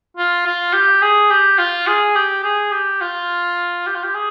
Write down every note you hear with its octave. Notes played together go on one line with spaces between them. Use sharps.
F4
F4
G4
G#4
G4
F4
G#4
G4
G#4
G4
F4
G4
F4
G4
G#4